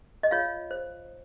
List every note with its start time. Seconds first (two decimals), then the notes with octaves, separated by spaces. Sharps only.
0.23 D#5
0.31 F4 C#5 F5
0.71 C5